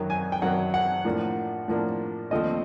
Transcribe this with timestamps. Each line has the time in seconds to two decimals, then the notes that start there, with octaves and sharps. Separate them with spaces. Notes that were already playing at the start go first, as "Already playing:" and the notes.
Already playing: F#2 D#3 F#3
0.10 G#5
0.32 G5
0.42 F#2 D#3 F#3 F#5
0.74 F#5
1.05 A2 F3 A#3 D4
1.68 A2 F3 A#3 D4
2.31 D#2 D3 F3 A3 C4 D#5